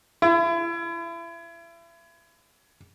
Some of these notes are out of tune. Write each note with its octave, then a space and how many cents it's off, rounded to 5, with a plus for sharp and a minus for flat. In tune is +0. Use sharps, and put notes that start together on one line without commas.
E4 +35